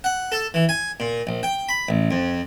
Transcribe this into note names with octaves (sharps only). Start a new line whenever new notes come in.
F#5
A4
E3
G#5
A#2
A#1
G5
B5
A1
F2